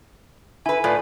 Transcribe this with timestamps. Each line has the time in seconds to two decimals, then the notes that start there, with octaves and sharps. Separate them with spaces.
0.66 E4 B4 G#5
0.84 A2 F4 B4 D5